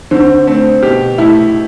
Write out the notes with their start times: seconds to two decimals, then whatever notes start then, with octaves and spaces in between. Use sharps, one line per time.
0.11 D3 C4
0.47 A3 C4
0.83 B2 G4
1.18 A3 E4